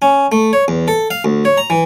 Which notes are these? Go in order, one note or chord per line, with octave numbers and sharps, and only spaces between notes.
C#4
A3
C#5
E2
A4
F5
D2
C#5
A#5
E3